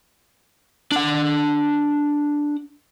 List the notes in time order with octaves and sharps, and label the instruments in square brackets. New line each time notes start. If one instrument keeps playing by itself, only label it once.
[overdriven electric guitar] D4 F#5